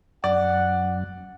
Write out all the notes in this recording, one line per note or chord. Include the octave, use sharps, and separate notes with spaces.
F#2 D5 F#5